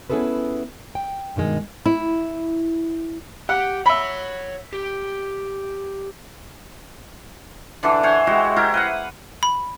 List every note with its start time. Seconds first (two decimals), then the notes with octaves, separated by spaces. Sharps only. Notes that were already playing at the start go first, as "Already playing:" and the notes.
0.10 B3 C#4 E4 G#4 A4 B4
0.95 G5
1.36 G2 B2 D#3 G#3
1.86 E4
3.49 G4 F#5
3.86 C#5 E5 F#5 B5
4.73 G4
7.83 D3 E3 D4 A4
8.03 C5 C#5 F#5 G#5
8.27 G#3 E4 F#4 G4
8.56 E4 G4 A#4 C5
8.74 B4 F5 F#5
9.43 B5